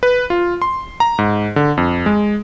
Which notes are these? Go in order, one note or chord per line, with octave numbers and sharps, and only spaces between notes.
B4
F4
C6
A#5
G#2
D3
F2
G#3